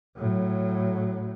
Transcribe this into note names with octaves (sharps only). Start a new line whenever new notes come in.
A2 F#3